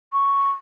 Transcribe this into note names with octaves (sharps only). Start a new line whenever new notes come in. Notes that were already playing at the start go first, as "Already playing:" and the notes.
C#6